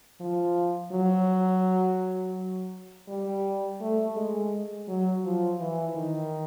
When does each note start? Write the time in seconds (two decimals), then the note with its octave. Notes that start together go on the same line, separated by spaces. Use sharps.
0.20 F3
0.92 F#3
3.08 G3
3.80 A3
4.16 G#3
4.88 F#3
5.24 F3
5.60 E3
5.96 D#3